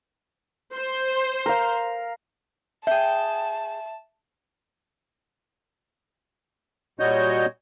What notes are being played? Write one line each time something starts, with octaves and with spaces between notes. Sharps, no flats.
C5
A#4 F5
G#4 E5 G5 A5
A#2 G3 F#4 C#5 D#5 G6